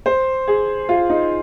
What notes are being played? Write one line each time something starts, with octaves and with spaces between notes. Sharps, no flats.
C5
G#4
F4
D#4